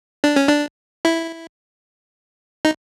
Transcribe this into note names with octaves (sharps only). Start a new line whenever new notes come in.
D4
C#4
D4
E4
D#4